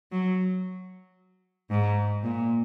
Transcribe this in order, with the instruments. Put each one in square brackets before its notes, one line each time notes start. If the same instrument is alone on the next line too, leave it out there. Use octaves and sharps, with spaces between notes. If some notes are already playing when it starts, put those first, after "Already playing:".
[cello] F#3
G#2
A#2